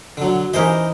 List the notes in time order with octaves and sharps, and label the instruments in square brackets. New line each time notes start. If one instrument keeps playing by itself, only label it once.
[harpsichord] D3 F#3
[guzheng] E3 D#4 G4 [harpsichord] A#4 C5 D#5